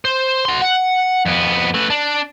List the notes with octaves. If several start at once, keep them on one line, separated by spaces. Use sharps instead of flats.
C5
F#4 C6
F#5
F2 B3
A3 B4
D4